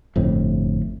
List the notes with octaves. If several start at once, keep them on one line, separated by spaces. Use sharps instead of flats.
G1 F2 A2